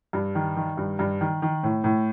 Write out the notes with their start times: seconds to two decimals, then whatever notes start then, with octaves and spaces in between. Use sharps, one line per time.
0.13 G2
0.35 D#3
0.57 D#3
0.77 G2
0.99 G2
1.21 D#3
1.42 D#3
1.63 A2
1.84 A2